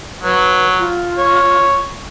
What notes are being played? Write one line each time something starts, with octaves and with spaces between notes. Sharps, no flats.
F#3 B4
F4
C#5